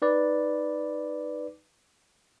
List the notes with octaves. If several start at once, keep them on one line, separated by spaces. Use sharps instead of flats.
D#4 B4 D5